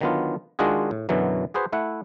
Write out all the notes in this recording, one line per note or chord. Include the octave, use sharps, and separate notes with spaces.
D3 D#3 F#3 B3 D4 F4
D#3 G#3 D4 F4 F#4 G#4
A2
F#2 B2 D3 E3 F#3
F#4 G#4 B4 C5 F#5
A3 E4 F#5